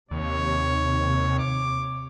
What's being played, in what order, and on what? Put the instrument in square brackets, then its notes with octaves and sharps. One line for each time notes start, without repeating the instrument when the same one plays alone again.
[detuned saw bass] D#2 [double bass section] C3 [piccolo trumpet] C#5
[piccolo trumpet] D6